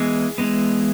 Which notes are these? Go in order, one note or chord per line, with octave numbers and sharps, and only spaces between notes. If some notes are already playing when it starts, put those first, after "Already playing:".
Already playing: E3 G#3 B3 G#4
E3 G#3 B3